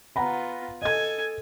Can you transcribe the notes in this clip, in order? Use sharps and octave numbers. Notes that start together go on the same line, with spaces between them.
B3 F4 F#5 A#5 B5
A4 D#5 G#5 G#6